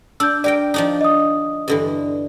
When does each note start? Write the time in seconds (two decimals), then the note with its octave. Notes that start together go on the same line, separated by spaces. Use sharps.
0.20 D4 E6 G6
0.44 G4 A#4 D5 G5
0.74 F3 D4 D#4
1.01 D#5 D#6
1.68 G2 D3 E3